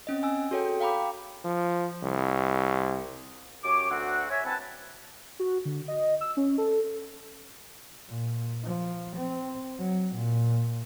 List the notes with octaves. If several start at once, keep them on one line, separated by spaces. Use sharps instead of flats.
C4 C#4 D#5
G#5 E6
F#4 G#4 A4 C#5 G5
F5 G5 A#5 B5 D6
F3
C2
F#2 G4 C#5 D6
D2 C4 F#4 F#5
C#5 E5 G#5
C4 E4 B4 F#5 G#5 A5
F#4
D3
D#5
E6
C#4
A4
A#2
F3
C4
F#3
A#2